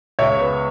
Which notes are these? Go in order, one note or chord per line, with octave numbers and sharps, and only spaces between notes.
C#2 C#5 E5
B3